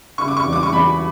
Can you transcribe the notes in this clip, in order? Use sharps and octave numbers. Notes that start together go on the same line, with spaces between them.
C#3 C#6
D6
C#6
E2
D6
C#6
E2 B5